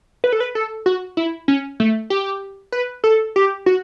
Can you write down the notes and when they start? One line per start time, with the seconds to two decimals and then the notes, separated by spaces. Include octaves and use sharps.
0.24 B4
0.33 A4
0.40 B4
0.55 A4
0.86 F#4
1.17 E4
1.48 C#4
1.80 A3
2.10 G4
2.72 B4
3.04 A4
3.36 G4
3.66 F#4